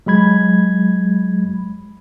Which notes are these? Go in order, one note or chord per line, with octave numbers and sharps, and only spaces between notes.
F#3 G#3 B5 G#6